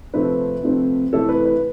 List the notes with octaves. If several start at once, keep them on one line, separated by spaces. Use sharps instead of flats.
C3 F3 A3 C4 B4
C3 F3 A3 C4
C3 E3 A3 C4 A4
B4
B4